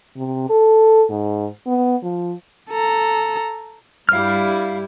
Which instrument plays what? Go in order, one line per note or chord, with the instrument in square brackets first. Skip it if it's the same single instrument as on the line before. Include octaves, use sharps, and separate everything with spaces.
[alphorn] C3
A4
G#2
B3
F3
[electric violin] A4 A#5
[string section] G2 G3 E4 [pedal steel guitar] F5 F6